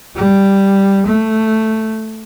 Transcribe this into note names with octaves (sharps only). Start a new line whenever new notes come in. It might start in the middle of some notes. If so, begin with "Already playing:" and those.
G3
A3